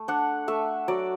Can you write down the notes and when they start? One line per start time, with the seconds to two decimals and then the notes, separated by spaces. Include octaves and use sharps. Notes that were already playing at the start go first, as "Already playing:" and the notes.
Already playing: A3
0.08 D4 F#5
0.48 A3 E5
0.88 F#3 D5